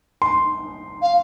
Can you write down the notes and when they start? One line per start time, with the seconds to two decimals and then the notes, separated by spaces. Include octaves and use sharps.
0.22 C6
1.02 F5